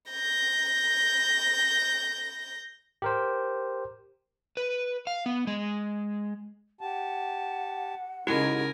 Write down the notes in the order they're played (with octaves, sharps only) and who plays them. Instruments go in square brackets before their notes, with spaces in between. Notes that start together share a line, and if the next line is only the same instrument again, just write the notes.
[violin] G6 A#6
[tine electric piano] G4 A#4 C5
[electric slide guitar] B4
F5
B3
G#3
[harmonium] G4 A5 [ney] F#5
[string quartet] C#3 A#4 G#5 [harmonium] G#3 D#4 [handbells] E4 F#4 G4